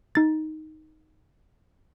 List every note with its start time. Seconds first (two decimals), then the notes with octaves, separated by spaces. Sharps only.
0.15 D#4 A6